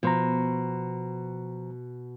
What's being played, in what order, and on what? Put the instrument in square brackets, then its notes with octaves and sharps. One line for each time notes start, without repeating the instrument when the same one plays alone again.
[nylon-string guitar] B2 [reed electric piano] F3 C5 A#5